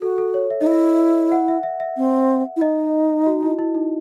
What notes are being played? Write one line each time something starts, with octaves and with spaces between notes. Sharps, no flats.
F#4 A4
A4
C#5
E5
D#4 D#5
E4 E5
F#5
E5
E5
E5
C4
E4
D#4 D#5
F#4
E4
E4
D#4